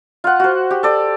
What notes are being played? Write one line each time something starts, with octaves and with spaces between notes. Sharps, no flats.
F4 F#5
F#4 C5
G4
A4 D5